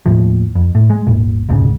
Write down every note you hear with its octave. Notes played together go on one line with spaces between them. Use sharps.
D#2 A2 F3
F2
A2
G#3
D#1 G#1 A#2
E1 D2 G#2 C#3